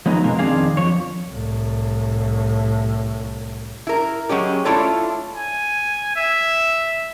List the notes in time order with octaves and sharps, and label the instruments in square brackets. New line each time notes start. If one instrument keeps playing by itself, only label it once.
[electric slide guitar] F3 F#3 G#3 B3 D#4
F2 B2 G#3 A#3
F2 D#3 C4 D4 G#4 F5
F2 D#3 F3 C#5
[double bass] C2 A2
[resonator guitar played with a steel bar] E4 A#4
F#3 G#3 C#4 G4
A3 D4 E4 F4 A4 C#5
[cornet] G#5
E5